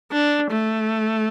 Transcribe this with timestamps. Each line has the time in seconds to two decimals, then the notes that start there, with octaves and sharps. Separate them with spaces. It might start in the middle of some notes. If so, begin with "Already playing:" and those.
0.12 D4
0.51 A3